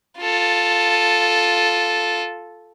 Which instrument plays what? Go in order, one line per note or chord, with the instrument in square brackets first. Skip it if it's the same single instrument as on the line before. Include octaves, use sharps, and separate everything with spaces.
[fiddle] F4 A4